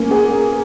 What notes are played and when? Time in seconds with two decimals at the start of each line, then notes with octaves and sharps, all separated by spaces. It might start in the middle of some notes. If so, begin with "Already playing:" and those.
Already playing: A#3 C#4
0.11 G#4